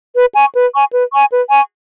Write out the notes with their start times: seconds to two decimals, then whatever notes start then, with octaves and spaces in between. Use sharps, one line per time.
0.15 B4
0.34 G#5 C#6
0.54 B4
0.72 G#5 C#6
0.93 B4
1.12 G#5 C#6
1.31 B4
1.51 G#5 C#6